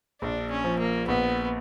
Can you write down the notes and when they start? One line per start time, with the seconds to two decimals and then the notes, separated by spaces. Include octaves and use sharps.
0.21 A#1 D4
0.51 C#4
0.64 F3
0.79 A#3
1.08 A#1 B3